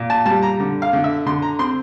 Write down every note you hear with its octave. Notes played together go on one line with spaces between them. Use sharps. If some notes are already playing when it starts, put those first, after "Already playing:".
Already playing: A#2
A5
G3 A5
A#5
D3
F5
D3
E5
D3 C6
A#5
C4 C6